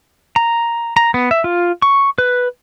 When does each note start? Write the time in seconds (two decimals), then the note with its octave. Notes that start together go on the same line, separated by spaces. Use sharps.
0.36 A#5
0.97 A#5
1.14 B3
1.31 E5
1.44 F4
1.82 C#6
2.18 B4